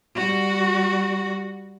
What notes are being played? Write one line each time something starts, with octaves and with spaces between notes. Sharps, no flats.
G3 F#4